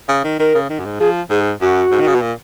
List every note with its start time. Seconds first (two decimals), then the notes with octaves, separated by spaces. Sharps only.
0.09 C#3
0.24 D#3
0.39 D#3 A#4
0.55 C#3
0.70 D#3
0.80 F#2
0.85 G#2
1.00 F3 G#4
1.30 G#2 G#4
1.61 F#2 F#4
1.92 G#2
2.01 D#3
2.07 C#3
2.15 B2
2.22 A#2